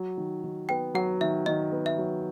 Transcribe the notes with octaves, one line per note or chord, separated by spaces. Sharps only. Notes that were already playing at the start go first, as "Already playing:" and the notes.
Already playing: F#3
D#3
D#3
B3 G5
F#3 F#5
D#3 E5
D#3 D#5
B3
E5
F#3